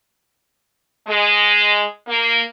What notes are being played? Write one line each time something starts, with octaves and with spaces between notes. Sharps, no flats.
G#3
A#3